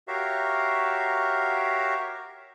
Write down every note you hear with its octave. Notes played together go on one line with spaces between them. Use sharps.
F#4 G4 A#4 C#5 E5 F5